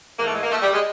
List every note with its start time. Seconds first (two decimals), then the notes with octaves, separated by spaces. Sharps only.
0.18 G#2 E3 A#3
0.26 A3
0.35 G#3
0.43 A#3
0.51 A3
0.62 G3
0.74 G#3